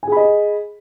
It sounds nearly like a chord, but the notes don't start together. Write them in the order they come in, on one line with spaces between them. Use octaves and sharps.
G#5 G#4 B5 D#5